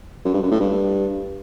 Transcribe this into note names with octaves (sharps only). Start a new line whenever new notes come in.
F#2
G2
F#2
A2
G2